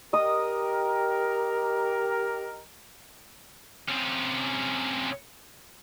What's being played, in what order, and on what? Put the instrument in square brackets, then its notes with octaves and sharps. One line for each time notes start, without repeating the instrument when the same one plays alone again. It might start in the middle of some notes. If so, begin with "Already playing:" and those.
[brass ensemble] G4 A#4 [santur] D#5 D#6
[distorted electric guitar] C3 C#4